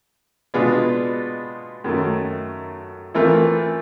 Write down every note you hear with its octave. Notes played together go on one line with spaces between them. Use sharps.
B2 G#3 B3 D4 F4
F#2 D#3 F#3 A3
E3 A3 C4 F4 A#4